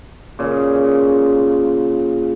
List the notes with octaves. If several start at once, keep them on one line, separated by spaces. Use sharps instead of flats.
A#2 C#3